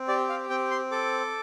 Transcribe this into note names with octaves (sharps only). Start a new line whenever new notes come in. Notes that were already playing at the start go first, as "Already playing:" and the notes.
Already playing: C4
G4 D5
F5
C4 G5
C6
A4 D6